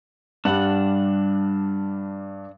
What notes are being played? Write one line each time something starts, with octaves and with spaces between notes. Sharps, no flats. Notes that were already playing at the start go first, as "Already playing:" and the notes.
G2 G3 D4 F#5